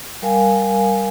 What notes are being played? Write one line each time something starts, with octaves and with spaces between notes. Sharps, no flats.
G3 A#4 F5 G#5